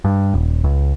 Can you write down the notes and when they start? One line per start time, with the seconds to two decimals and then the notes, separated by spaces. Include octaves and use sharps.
0.05 G2
0.34 D#1
0.64 C#2